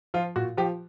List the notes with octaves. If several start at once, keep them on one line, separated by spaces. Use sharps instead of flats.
F3 F4
A#2 F#4
F3 G4